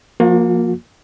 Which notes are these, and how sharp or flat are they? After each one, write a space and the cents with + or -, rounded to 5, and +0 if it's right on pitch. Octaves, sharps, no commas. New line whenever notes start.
F3 +0 A#3 +0 F#4 -45